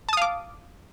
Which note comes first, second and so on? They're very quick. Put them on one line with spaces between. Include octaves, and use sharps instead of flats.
A5 D#6 F5 D6